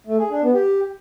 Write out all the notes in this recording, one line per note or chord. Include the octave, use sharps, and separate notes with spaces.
A3
G#4
D4
B3
G4